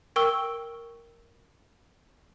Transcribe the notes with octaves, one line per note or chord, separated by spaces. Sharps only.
A#4 G5 C#6 E6 G7